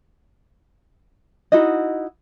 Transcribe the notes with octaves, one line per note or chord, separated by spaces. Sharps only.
D#4 E4 F#4 D#5